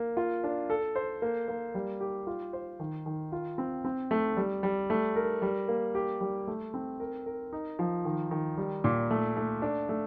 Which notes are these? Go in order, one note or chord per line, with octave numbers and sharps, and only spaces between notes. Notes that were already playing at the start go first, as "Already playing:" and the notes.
Already playing: A#3
F4
D4
A4
C5
A#3
A#3
G3
G4
F4
C5
D#3
D#3
F4
C4
C4
A3
G3
G3
A3
A#4
G3
A#3
G4
G3
A3
C4
A#4
A#4
D#4
F3
D#3
D#3
G3
A#2
A3
A3
D4
A3